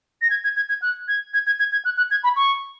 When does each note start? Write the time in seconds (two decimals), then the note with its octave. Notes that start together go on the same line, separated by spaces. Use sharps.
0.22 A#6
0.30 G#6
0.44 G#6
0.56 G#6
0.69 G#6
0.82 F#6
1.08 G#6
1.34 G#6
1.46 G#6
1.59 G#6
1.72 G#6
1.85 F#6
1.97 F#6
2.11 G#6
2.24 B5
2.36 C#6